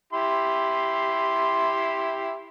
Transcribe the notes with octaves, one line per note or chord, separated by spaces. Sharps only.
E4 G4 C6